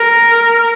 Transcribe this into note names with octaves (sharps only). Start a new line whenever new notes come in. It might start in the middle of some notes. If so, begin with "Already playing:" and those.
Already playing: A#4